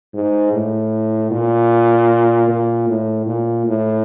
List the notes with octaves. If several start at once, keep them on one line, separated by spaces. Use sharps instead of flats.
G#2
A2
A#2
A#2
A2
A#2
A2